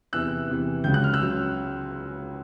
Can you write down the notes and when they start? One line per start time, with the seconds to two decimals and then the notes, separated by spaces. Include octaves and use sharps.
0.13 E2 C3 E3 E6 F#6
0.48 E2 C3 E3
0.84 C#2 C#3 F#3 G6
0.94 F#6
1.04 F6
1.13 E6 F#6
1.20 C#3 F#3